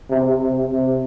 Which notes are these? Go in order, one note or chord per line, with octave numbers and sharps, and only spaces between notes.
C3
C3
C3